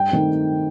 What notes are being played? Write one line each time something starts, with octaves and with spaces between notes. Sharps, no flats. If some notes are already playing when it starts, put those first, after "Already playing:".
Already playing: G2 G5
D#3 A3 C4